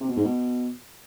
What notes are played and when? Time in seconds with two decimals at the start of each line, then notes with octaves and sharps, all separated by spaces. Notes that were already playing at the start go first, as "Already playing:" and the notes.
0.01 C3
0.08 B2
0.16 G#2
0.24 B2